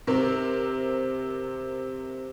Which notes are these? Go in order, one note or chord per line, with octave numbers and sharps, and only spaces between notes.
C3 C4 A#4